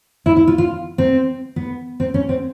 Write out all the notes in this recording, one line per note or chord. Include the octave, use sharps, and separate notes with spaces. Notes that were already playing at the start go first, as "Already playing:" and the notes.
E4
E4
F4
F4
C4
B3
C4
C#4
C4